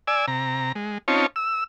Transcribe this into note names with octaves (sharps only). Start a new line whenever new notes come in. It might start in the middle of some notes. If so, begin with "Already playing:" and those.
D5 G#5 E6
C3 A#5
G#3
C4 C#4 D#4 F4 C#5 A5
E6